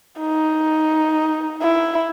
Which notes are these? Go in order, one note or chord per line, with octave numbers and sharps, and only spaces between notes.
D#4
E4